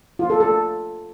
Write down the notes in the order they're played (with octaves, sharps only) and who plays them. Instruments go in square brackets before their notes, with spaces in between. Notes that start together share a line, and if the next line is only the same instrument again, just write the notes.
[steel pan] F4
A4
A4